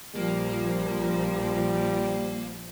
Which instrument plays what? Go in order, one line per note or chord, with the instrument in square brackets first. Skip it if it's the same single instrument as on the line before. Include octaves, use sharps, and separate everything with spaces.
[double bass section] A#1 F3 [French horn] G3 [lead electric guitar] A#3